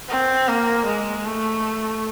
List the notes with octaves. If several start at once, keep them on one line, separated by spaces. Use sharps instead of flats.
C4
A#3
G#3
A3